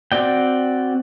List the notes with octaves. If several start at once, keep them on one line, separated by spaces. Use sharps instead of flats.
C4 F#4 D5 G5